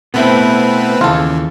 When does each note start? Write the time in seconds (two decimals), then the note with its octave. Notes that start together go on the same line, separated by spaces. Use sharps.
0.14 B2 A3 B3 C4 E4 B4
1.01 D#2 C#3 E3 F4 A4